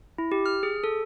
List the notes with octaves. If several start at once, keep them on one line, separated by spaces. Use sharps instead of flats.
E4
G4
F6
G#4
A4